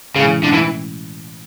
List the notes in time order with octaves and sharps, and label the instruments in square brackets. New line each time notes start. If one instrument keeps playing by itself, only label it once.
[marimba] A2 E3 G#3 C#4 E4 [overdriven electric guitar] C#3
[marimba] B2 A3 C#4 [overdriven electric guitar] D3
[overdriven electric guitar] E3